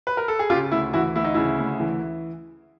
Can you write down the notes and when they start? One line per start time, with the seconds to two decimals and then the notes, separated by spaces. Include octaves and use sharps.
0.07 B4
0.17 A#4
0.28 A4
0.39 G#4
0.50 C#3 F4 G4
0.72 D2 E4
0.93 E3 E4 F#4
1.16 D2 E4
1.24 D#4
1.34 C#3 E4
1.59 D2
1.80 E3